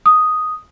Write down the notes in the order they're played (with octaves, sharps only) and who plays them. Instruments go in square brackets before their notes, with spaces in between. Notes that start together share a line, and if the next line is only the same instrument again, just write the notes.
[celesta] D#6